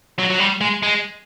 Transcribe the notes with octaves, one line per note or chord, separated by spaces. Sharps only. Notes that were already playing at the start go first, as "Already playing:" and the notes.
F#3
F#3
G3
G#3
G#3